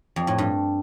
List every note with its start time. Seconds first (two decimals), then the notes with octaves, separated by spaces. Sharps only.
0.16 F2
0.27 A2
0.38 G2